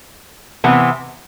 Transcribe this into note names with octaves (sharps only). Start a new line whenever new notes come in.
C3 E3 B3